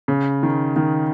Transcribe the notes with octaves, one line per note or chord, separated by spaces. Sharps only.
C#3
D#3
D#3